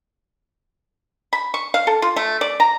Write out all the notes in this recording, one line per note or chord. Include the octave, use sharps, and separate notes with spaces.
B5
C#6
F5
A4
F4
A3
D5
A#5